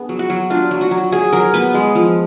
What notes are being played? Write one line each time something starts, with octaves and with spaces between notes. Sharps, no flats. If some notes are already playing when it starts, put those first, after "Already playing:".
Already playing: B3 D4 G#4
F#3
F#4
F#3
D4 F4
F#3
F#4
F#3
F#3 G#4
F#3 A#4
B3 B4
G#3
F3